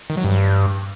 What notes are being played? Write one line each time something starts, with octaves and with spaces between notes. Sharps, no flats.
D#3
F#3
G2